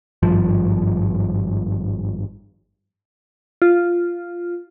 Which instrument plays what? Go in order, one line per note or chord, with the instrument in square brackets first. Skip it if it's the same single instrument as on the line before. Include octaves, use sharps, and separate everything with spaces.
[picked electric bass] G#1 G2 F3
[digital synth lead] F4